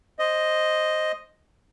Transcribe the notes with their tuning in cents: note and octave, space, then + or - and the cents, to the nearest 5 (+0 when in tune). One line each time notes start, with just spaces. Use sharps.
C5 +0 D#5 +0